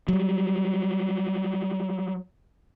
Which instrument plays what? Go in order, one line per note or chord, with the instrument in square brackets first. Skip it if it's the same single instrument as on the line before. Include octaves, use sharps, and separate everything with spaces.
[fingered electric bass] F#3 G3